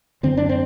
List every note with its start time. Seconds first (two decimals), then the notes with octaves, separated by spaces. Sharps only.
0.23 F#2 D3 C4
0.37 D4
0.49 C4